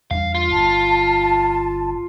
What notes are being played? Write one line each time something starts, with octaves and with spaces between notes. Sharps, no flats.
E2 G3 D4 F5
F4
G1 A5